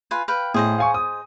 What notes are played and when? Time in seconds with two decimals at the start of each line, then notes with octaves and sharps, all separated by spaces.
0.11 F4 B4 G#5
0.28 B4 F5 G5
0.54 A2 G#4 C5 D#5
0.78 F5 G#5 C#6
0.94 D#6